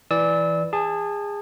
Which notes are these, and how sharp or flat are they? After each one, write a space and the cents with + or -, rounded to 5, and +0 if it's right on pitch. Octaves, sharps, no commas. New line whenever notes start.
E3 +0 D5 +0 E6 -30
G#4 -25 A5 +0